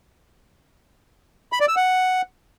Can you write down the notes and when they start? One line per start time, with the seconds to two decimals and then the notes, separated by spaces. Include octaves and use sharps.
1.52 B5
1.60 D5
1.68 E6
1.76 F#5